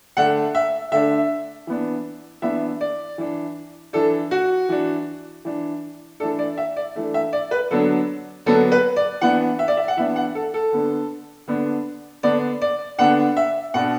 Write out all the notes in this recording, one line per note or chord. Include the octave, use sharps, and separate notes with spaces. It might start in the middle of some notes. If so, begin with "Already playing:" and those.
D3 A3 D4 F#5
E5
D3 A3 D4 E5
E3 B3 D4
E3 B3 D4 E5
D5
E3 D4
E3 D4 A4
F#4
E3 D4
E3 D4
E3 A3 D4 A4
D5
E5
D5
E3 A3 D4
E5
D5
B4
D3 F#3 B3 D4 A4
D3 F#3 B3 D4 A4
B4
D5
E3 B3 D4 F#5
E5
D5
E5
F#5
E3 B3 D4 E5
F#5
A4
A4
D3 B3 D4
D3 B3 D4
D3 B3 D4 D5
D5
D3 B3 D4 F#5
E5
B2 B3 D4 F#5